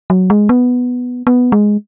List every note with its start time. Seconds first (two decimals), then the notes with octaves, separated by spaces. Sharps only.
0.10 F#3
0.30 G#3
0.49 B3
1.27 B3
1.52 G#3